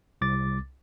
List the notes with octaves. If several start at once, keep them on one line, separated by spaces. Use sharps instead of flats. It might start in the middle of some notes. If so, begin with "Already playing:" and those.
C2 D6 A6